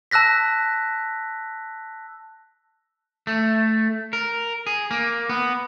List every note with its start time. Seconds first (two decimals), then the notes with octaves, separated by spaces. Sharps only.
0.11 A5 E6 F#6 A#6 B6
3.27 A3
4.13 A#4
4.67 G#4
4.91 A#3
5.29 B3